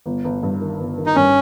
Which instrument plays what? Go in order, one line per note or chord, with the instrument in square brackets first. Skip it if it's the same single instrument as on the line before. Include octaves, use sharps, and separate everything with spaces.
[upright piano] G1
G1
G2
D#3
G1
D#3
[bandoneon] D#4
[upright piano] G2 [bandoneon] C#4